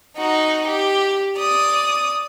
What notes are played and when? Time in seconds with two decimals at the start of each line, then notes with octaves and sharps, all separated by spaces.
0.17 D#4 F#4
0.68 G4
1.38 D5 D#6